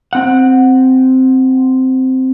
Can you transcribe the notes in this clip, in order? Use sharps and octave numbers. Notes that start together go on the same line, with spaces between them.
C4 F#5